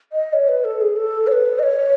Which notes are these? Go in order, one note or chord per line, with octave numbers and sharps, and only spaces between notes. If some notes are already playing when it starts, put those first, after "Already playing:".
D#5
C#5
B4
A4
G#4
A4
C#5
B4
D#5
C#5